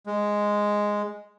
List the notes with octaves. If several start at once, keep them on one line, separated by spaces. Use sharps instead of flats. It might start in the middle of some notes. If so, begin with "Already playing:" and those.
G#3